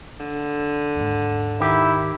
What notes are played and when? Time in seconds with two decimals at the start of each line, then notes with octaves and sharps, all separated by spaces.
0.20 D3
0.96 D#2 G#2
1.60 D#3 E4 G4